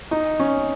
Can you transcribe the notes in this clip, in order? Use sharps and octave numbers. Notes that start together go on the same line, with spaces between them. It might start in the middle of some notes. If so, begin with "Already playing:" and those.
D#4
C#4